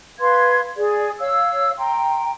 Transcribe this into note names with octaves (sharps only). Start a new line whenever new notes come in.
B4 F5 C6 G#6
G#4 D5
C#5 F5 E6
G5 A#5 C6